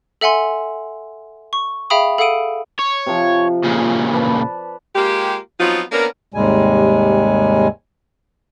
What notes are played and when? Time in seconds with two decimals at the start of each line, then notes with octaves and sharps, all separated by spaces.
0.21 A4 E5 F#5 G#5 C6
1.53 C#6
1.90 G#4 E5 F5 G5 B5 D#6
2.18 A4 F5 F#5 D#6 D7 D#7
2.79 C#5
3.06 C3 F3
3.64 A#2 C#3
4.13 B4 D5 A5
4.95 G#3 A#3 F4 G4
5.60 F3 F#3 B3 C4 D#4 F4
5.91 A#3 B3 C#4 D4 A#4
6.34 D#2 G#2 C3 G3 G#3 G#5